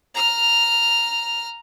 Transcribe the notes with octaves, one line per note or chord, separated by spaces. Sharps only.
A#5 F6